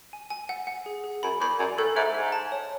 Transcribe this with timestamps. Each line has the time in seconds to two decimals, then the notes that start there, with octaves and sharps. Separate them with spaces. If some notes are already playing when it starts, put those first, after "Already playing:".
0.13 G#5
0.30 G#5
0.49 F#5
0.67 F#5
0.86 G#4
1.04 G#4
1.23 F#2 B5
1.41 E2 B5
1.59 F#2 D5
1.77 A2 A4
1.96 G#2 E5
2.15 G#2 E5
2.32 A5
2.52 C#5